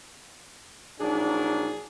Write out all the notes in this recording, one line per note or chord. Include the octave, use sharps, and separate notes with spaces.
A#1 F#3 D4 D#4 G#4